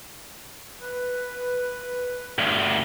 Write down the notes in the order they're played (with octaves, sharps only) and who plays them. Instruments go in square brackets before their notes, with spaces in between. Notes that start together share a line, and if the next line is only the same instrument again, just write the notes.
[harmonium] B4
[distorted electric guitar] D2 G2